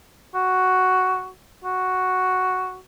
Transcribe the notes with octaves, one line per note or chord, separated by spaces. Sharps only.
F#4
F#4